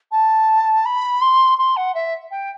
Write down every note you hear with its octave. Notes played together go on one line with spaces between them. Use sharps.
A5
B5
C6
C6
F#5
E5
G5